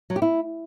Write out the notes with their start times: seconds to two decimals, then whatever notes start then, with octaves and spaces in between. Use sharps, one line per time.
0.10 F#3
0.16 G4
0.22 E4